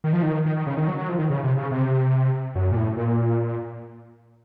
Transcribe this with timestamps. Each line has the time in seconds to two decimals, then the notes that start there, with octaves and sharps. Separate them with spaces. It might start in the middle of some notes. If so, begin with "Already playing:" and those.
0.04 D#3
0.13 F3
0.22 D#3
0.45 D#3
0.56 D#3
0.67 C#3
0.77 D#3
0.87 F#3
0.98 F#3
1.08 F3
1.19 D#3
1.30 C#3
1.43 C3
1.57 C#3
1.71 C3
2.55 F#2
2.72 A#2
2.76 A2
2.97 A#2